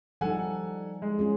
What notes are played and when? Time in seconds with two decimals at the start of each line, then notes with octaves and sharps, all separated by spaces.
0.21 F3 G3 D#4 A4 F#5 G#5
1.02 G#3
1.19 C#4 F4 G#4